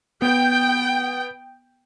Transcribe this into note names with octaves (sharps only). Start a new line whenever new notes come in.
B3 G5